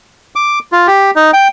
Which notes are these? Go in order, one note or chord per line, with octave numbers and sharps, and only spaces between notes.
D6
F4
G4
D#4
G5